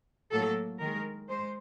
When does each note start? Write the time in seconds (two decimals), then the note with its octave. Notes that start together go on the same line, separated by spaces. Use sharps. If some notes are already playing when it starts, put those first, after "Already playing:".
0.32 A2 F#3 A#3 A4
0.81 D#3 G#3 A#4
1.28 G#3 C5